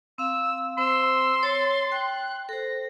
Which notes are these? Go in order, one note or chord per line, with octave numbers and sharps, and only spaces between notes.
C4 F5 E6
C4 C5 C6 E6
C#5 A6
G5 F#6
A4 C5 A#6